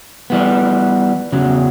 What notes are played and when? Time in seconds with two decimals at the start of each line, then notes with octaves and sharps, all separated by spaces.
0.30 E3 G3 B3
1.32 E2 C#3 F#3